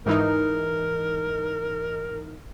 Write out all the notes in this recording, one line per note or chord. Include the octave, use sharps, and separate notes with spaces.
G#2 E3 D#4 A#4